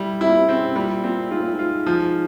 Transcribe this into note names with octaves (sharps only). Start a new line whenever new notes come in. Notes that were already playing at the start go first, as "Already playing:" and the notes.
Already playing: G3 E4
C3 E4
A#2
C3
C#3 C4
C3
A#2 G3
A#2 C4
G#2 F4
A#2
G#2
F4
F3